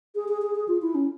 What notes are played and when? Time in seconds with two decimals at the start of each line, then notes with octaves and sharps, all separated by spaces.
0.15 G#4
0.28 G#4
0.42 G#4
0.55 G#4
0.68 F4
0.82 E4
0.95 C#4